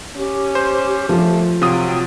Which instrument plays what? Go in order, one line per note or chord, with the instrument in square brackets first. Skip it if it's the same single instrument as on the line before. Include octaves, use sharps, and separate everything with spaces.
[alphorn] C#4 [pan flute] G4
[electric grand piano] C5
[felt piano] F3 [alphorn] A3
[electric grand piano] C3 F4 D#6 [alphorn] F#3 [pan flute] G5